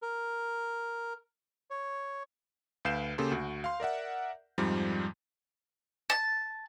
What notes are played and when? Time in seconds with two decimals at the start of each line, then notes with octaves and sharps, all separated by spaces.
0.02 A#4
1.70 C#5
2.85 D2 B4 F5 G6 C7 E7
3.18 C#3 A#3 G4 A4 C6
3.31 D2 F#4
3.64 F5 C6
3.80 A#4 D5 E5 F#5
4.58 F2 G#2 F3 G3
6.10 A5